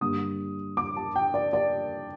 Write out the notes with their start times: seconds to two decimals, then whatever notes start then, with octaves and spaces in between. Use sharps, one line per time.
0.01 G2 D3 G3 A#3 D#6
0.77 D6
0.96 A5
1.16 G5
1.34 D5
1.53 D5